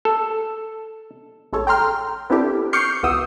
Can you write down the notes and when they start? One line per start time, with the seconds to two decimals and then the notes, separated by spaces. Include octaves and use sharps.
0.05 A4
1.53 A1 G#3 A4 C#5
1.67 G5 A#5 C6 F6
2.30 B3 C4 D4 E4 G4 A4
2.73 C#6 D6 F6 G6 C7 C#7
3.03 C#2 E3 B3 F#4 D#6 E6